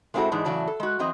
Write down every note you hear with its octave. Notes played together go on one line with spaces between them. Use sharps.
G#3 A3 C4 E4 F#4 A4
G#2 E3 G#3 D4
A2 C#3 E3 F#3 D5 A5
A4
G#3 F#4
E3 F#3 C4 D#5